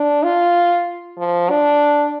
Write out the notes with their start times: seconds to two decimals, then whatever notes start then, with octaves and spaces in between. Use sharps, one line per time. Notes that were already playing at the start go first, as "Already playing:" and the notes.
Already playing: D4
0.24 F4
1.18 F3
1.50 D4